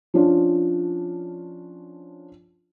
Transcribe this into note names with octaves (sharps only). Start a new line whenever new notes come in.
F3 C#4 D4 F4